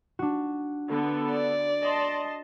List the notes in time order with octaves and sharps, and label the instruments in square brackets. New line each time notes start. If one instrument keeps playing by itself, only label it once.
[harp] D4 F#4
[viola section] D3 B3 A4
[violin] D5
[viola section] D#5 A5 C6